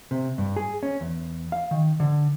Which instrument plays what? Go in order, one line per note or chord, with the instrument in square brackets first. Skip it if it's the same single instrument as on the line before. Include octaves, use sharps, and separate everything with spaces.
[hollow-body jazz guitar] C3
G2
G#4
C#4
E2
F5
D#3
D3